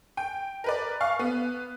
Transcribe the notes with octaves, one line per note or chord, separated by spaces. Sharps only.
G5
A#4 B4 D5
F5 C#6
B3